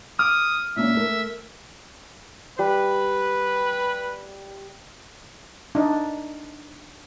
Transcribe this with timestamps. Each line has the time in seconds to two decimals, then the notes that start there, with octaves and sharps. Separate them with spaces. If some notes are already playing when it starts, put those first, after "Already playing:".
0.19 D6 D#6 F6 D7
0.77 A#2 A#3 C#4 E5
0.95 A3 A#4
2.59 G3 B4
5.75 D4 D#4